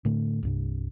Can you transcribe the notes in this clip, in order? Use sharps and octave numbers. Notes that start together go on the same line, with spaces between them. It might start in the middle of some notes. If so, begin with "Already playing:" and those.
A2 D3 A3
C2 G2 C3